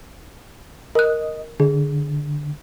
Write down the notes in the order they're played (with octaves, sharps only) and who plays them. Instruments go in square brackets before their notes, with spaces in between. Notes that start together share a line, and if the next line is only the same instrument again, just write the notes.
[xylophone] A#4 F#6 [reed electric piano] D#5
[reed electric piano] D3 [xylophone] G#4